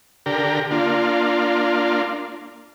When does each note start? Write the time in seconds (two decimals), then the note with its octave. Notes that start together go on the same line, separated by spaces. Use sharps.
0.26 D3 G4 A#4
0.71 A#3 D4 F4